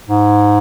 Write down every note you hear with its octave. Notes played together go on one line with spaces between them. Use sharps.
G#2